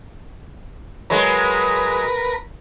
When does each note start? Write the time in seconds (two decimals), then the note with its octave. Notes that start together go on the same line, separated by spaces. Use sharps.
1.10 F#3 G#3 A#4 B4